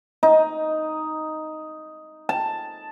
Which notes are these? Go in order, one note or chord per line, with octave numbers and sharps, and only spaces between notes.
D#4
A5